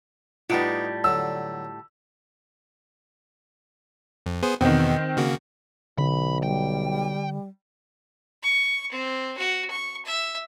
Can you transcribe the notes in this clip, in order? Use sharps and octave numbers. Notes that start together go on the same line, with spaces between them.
A2 G3 B3 D#4 F4 F#5 D7
D3 F#3 E6
F2
B3 G#4 C5
E2 B2 D#3 B3 C4
C#3 A#3 F#4
B1 D3 B5
G3 G5
C#6
C4
F#4
C#6
E5